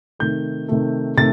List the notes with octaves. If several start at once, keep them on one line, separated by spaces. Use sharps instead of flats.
C3 D#3 A3 G6
C3 D#3 A3
C3 D#3 A3 A6